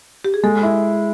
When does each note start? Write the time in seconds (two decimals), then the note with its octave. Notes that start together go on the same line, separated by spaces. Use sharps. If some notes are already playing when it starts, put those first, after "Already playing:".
0.25 G4
0.34 G#4
0.43 G#3 A4
0.63 E4